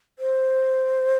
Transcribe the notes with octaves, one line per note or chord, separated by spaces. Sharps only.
C5